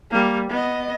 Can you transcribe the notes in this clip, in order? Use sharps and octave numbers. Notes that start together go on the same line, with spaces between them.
G3 A#3
B3 D#5